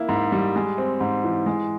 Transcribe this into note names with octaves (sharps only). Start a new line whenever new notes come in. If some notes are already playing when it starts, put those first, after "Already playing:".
Already playing: A#3 E4
G#2
G3
G#3
C4
G#2
E3
G#3